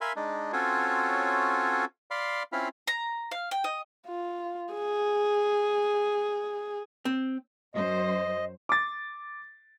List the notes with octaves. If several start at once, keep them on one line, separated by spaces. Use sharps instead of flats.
A#4 E5 F5 G#5 B5 C6
G#3 D4 D#4
C4 C#4 F4 F#4 A4 C#5
D5 F5 B5 C6
C4 C#4 E4 F4 F5 B5
A#5
F5
G5
D#5
F4
G#4
C4
F#2 C5 D#5
D6 A6